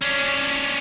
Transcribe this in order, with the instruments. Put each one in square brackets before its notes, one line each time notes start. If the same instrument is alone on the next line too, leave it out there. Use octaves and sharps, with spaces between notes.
[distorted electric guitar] C#4 D4